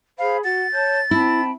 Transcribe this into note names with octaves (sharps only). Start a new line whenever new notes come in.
G#4 C5 F5 B5
F#4 F#5 A6
C#5 A5 G6
C4 E4 G5 A5 B5